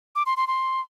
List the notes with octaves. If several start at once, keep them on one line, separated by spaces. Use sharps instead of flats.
D6
C6
C6
C6